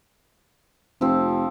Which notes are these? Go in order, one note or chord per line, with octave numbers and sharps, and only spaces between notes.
F1 F3 C4